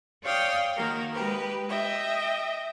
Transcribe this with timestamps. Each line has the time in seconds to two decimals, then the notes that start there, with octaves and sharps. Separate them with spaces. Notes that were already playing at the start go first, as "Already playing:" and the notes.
0.23 C#5 D5 F5 G5 D#6 F6
0.77 D#3 A#3 F#4 A#4
1.14 G#3 G4 B4
1.68 D#5 E5 G5